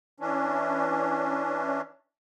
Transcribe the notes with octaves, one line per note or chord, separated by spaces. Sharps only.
E3 C#4 D4